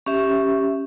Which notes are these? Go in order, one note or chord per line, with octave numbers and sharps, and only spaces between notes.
C#4 G4 E5